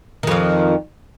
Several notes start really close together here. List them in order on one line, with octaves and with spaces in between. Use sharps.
D#3 F2 F3